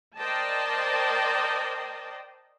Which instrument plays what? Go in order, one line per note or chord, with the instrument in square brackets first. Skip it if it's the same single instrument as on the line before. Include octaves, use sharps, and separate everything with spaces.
[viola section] A#4 C5 D5 D#5 G5 A5